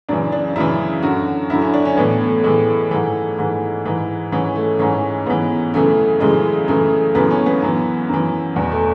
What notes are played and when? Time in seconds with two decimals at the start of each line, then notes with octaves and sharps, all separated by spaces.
0.09 F#2 C#3 E3 D4
0.32 D4
0.55 F#2 C#3 E3 E4
1.02 F#2 D3 F#4
1.50 F#2 D3 E4
1.62 C#4
1.74 D4
1.85 C#4
1.97 A2 E3 B3
2.21 A3
2.44 A2 E3 G#3
2.91 G#2 E3 A3
3.39 G#2 E3
3.85 G#2 E3
4.32 G#2 E3 C#4
4.56 A3
4.79 G#2 E3 C#4
5.26 G#2 E3 B3
5.74 F#2 C#3 E3 A3
6.20 F#2 C#3 E3 G#3
6.68 F#2 C#3 E3 A3
7.15 F#2 C#3 E3 B3
7.31 C#4
7.46 B3
7.62 F#2 E3
8.09 F#2 E3
8.56 E2 B2 B3
8.71 A3